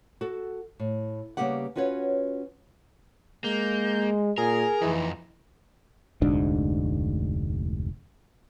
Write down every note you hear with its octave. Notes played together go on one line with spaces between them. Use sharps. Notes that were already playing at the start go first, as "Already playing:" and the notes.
F#4 A4
A2
C#3 G3 A#3 B3 G4 F#5
C#4 F4 F#4 B4 C#5
G#3 A#3 G6
A#2 G#4 A#4
F2 E3 D#4
F1 D2 G#2 D4